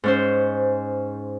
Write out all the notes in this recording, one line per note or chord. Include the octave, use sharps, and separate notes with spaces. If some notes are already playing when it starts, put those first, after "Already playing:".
G#2 C#4 C5